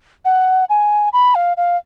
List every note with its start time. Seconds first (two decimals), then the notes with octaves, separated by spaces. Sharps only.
0.25 F#5
0.69 G#5
1.13 B5
1.35 F5
1.57 F5